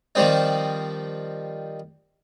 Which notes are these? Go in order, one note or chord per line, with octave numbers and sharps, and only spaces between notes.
D#3 F3 G3 C4 D#4